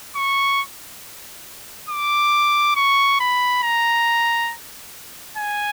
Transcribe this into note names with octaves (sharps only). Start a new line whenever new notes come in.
C#6
D6
C#6
B5
A#5
G#5